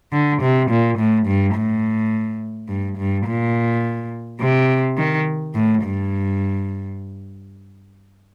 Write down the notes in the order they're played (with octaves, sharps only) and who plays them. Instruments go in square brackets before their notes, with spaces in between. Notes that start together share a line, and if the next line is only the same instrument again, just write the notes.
[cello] D3
C3
A#2
A2
G2
A2
G2
G2
A#2
C3
D#3
A2
G2